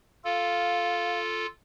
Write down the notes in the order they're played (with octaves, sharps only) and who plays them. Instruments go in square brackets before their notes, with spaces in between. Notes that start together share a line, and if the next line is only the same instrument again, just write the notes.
[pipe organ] F4 A4 [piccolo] F5